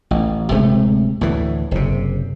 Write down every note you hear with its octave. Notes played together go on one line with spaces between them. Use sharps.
A1
D1 C3 G#3 A3
D2 A2 E3
F#1 C3